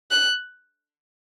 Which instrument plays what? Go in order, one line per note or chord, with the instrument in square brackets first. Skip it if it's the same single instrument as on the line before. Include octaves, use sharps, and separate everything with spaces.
[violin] F#6